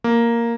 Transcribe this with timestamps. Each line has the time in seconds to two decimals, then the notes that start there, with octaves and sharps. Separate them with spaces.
0.04 A#3